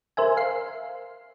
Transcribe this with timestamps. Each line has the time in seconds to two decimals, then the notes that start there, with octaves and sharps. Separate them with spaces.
0.17 A#4 C5 E5 G#5
0.37 F5 C7